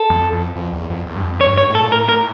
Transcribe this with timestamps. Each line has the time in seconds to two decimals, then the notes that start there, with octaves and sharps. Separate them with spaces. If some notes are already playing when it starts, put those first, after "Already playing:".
Already playing: A4
0.10 F2
0.32 F2
0.56 F2
0.73 E2
0.90 F2
1.06 E2
1.16 G2
1.23 F2
1.41 C#5
1.47 G2
1.58 C#5
1.70 A2
1.75 A4
1.79 A#2
1.88 A2 A#4
2.09 A#4